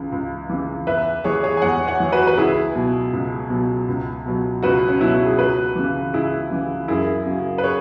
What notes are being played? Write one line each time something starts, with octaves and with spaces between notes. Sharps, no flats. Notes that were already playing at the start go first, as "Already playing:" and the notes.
Already playing: C#2 C#3 E3
C#2
C#3 E3
E2 B4 E5
E3 G#4 C#5
G#4 C#5
G#5
E2 C#5 F#5
C#5 F#5
E3
F#4 B4
B4
C#2 E4 G#4
B2 F#3
C#2
B2 F#3
C#2
B2 F#3
C#2 F#4 B4
C#4
B2 F#3 E4
F#4
G#4
C#2 F#4 B4
C#3 E3
C#2 E4 G#4
C#3 E3
F#2 E4 G#4
C#3 F#3
B4
G#4 C#5